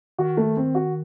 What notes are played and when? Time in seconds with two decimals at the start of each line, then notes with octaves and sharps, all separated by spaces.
0.18 D#3 F#4
0.37 A3
0.57 C4
0.75 F#4